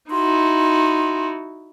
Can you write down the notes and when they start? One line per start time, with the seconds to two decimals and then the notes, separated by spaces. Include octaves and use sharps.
0.11 D#4 E4 F#4 C6